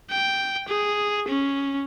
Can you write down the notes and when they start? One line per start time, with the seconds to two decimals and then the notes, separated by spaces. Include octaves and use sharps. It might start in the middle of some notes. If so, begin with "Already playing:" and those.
0.11 G5
0.69 G#4
1.28 C#4